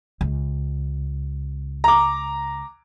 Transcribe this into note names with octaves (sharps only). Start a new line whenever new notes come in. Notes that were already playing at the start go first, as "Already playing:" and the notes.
C#2
A#5 D6